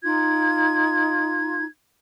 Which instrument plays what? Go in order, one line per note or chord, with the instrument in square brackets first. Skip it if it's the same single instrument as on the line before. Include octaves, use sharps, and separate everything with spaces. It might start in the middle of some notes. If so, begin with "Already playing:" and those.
[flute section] D#4 F4 G#6